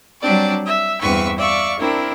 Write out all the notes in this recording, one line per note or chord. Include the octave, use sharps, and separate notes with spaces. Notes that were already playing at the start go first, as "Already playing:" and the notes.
F#3 G3 C4 D4 D5
E5
E2 G2 C4 B4 C#6 E6
D5 E5 F5 C#6
C4 D4 E4 A#4